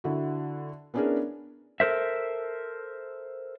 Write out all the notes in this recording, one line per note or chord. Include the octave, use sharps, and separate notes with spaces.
D3 E4 F#4
B3 C#4 D4 E4 G#4 A#4
A4 A#4 C5 E5